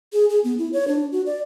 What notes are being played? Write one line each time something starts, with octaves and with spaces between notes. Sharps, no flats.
G#4
G#4
B3
E4
C#5
D4
F#4
D5